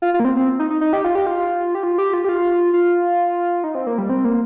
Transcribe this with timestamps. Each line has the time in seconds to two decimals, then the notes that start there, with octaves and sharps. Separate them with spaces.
0.02 F4
0.14 F4
0.20 A#3
0.25 C4
0.37 C4
0.59 D#4
0.70 D#4
0.81 D#4
0.93 G4
1.04 F4
1.15 G4
1.27 F4
1.75 G4
1.83 F4
1.98 G4
2.13 F4
2.24 G4
2.29 F4
2.74 F4
3.64 D#4
3.75 C4
3.87 A#3
3.98 G3
4.09 C4
4.25 A#3